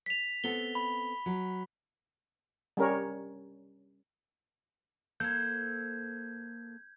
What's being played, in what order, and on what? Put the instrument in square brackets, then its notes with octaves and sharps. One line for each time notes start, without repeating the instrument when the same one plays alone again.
[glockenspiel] B6 F7
[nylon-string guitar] B3 C4 A4 [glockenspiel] G7
[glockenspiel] B5
[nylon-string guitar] F#3
[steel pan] G3 C#4 A#4 C#5
[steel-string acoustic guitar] A#3 A4 C5 [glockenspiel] G6 G#6